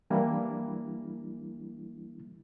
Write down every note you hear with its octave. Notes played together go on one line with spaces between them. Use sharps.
E3 G3 A#3 D4 E4